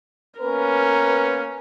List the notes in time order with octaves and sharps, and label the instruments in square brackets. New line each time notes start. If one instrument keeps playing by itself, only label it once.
[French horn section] A#3 B3 B4 [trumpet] C#4 [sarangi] A#4